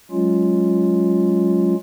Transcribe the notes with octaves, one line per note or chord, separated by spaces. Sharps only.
F#3 G#3 C#4 F4